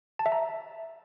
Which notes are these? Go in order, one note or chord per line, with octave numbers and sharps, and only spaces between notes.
A5
E5
A#5